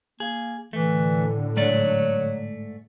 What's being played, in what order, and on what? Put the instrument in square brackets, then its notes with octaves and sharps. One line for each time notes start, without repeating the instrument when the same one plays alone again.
[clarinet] A#3 [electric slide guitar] G#4
[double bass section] A2 D3 [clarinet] E3 [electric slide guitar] A3
[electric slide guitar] G#2 A3 D5 [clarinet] F#3